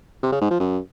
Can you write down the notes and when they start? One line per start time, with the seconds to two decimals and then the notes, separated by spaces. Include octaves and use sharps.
0.23 C3
0.32 C#3
0.41 G#2
0.51 F3
0.60 F#2